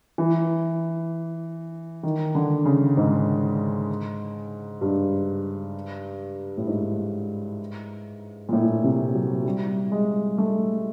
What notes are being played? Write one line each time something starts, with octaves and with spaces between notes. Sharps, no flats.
E3
D#3
D3
C#3
G#2
G2
A2
G#2
A#2
A2
C3
F#3
G3
G#3
A3